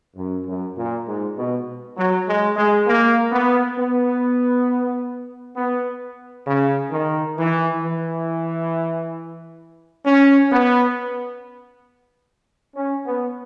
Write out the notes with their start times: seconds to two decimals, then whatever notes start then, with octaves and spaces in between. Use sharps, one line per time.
0.16 F#2
0.47 F#2
0.77 A#2
1.07 G#2
1.37 B2
1.97 F#3
2.27 G#3
2.56 G#3
2.87 A#3
3.32 B3
3.77 B3
5.56 B3
6.47 C#3
6.91 D#3
7.36 E3
7.81 E3
10.06 C#4
10.51 B3
12.76 C#4
13.06 B3